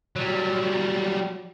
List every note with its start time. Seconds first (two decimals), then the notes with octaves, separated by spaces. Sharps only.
0.16 F#3 G3